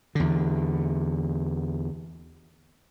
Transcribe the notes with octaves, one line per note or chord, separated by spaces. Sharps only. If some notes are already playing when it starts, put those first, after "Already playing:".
E2 D3